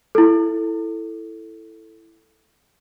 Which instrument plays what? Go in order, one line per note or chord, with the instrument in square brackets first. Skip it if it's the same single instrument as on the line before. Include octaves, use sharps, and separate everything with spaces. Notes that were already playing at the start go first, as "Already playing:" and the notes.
[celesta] E4 A4